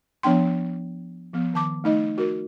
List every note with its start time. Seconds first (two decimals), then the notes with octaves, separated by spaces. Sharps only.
0.23 F3 B3 D4 G5 C6
1.33 F3 B3
1.54 D#3 A5 D6
1.84 A3 D#4 D#5
2.18 F#4 A#4